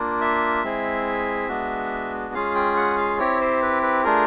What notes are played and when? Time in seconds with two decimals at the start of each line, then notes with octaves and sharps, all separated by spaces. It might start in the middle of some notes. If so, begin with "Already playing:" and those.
Already playing: A#3 D4 F4
0.21 E5
0.64 G#3 C4 E4 G#4
1.49 G#3 B3 D4 F#4
2.34 G#3 C#4 F4 G#4 F5
2.55 G5
2.77 F#5
2.98 F5
3.19 C4 E4 G4 C#5
3.41 C5
3.62 B4
3.83 B4
4.04 A3 D4 F4 G#4 A#4